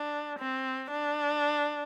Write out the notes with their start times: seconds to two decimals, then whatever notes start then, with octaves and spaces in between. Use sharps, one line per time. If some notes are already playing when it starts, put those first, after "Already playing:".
Already playing: D4
0.38 C4
0.92 D4